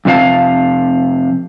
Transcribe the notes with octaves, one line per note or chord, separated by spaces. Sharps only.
F2 C3 C#4 F5 A5